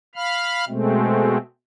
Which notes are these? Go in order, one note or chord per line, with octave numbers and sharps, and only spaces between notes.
F5 B5 F6
B2 G#3 A3 C4